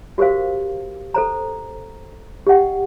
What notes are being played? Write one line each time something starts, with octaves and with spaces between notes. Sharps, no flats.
F#4 G4 A#4 C5 F5
A4 C5 A#5
G4 D#5 F#5 G5